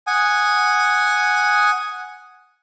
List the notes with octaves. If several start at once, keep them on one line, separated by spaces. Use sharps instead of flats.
F#5 G#5 D#6